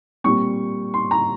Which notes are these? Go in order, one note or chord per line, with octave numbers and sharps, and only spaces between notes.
A#2 G3 C4 C#6
C6
A#5